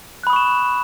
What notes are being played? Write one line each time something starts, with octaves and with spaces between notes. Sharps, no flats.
B5 C#6 D#6 F#6 E7